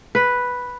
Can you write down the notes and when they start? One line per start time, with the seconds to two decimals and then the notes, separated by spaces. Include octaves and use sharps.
0.15 B4